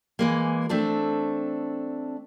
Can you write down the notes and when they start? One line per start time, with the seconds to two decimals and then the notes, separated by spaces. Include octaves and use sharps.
0.19 E3 G#3 A#3
0.69 A3 C4 D4 A4